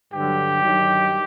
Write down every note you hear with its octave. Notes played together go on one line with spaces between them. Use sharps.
G2 D3 F#3 G4
G2 D#3 F#3